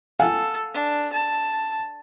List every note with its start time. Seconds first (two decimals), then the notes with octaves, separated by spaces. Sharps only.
0.20 A4 F5 F#5 G#5
0.74 D4
1.13 A5